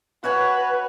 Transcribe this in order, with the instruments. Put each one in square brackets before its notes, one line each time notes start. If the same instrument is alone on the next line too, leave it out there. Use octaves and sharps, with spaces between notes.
[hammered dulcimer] F#4 C#5 G#5 [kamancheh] B4